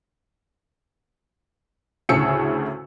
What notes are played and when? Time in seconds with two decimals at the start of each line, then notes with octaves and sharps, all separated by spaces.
2.09 D2 A2 C#3 G#4 E6 C#7